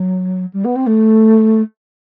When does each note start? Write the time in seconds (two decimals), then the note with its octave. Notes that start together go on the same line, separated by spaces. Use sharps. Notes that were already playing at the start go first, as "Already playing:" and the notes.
Already playing: F#3
0.53 G3
0.64 B3
0.76 C4
0.86 A3